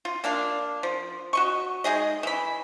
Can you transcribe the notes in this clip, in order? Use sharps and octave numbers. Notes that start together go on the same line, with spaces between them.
F4
A#3 D4 F5
F3
F#4 D#5 C#6
G#3 D#4 G#4 D#5
E3 B5